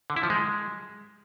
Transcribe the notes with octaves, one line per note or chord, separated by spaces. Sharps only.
D3
E4
F3
G#3